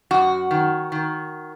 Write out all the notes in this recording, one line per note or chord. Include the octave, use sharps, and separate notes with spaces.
F#2 F#4
D#3
D#3